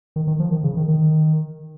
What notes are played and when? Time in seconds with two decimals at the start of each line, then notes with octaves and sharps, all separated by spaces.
0.16 D#3
0.27 D#3
0.40 F3
0.52 D#3
0.64 C#3
0.77 D#3
0.88 D#3